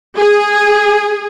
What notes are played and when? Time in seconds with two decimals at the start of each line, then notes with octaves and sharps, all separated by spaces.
0.17 G#4